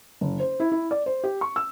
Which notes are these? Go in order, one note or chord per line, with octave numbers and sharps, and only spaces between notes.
F#1
C5
E4
E4
D5
C5
G4
C#6
E6